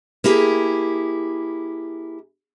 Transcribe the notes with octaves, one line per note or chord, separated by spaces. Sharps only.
A#3 E4 G4 G#4